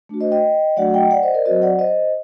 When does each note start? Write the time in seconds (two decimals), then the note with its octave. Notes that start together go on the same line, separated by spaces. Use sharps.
0.09 A3 D4 F#4
0.21 C5 D#5
0.31 D#5 G5
0.77 F#3 A3 D4 F#4 D5 F#5
0.89 F#5
0.94 D#5 G5
1.11 D5 F#5
1.23 C5 D#5
1.34 A#4 D5
1.46 F#3 C4 F#4 C5 D#5
1.62 D5 F#5
1.79 C5 D#5